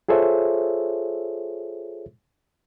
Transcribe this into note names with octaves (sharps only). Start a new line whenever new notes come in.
F4 G#4 A4 C5 C#5 E5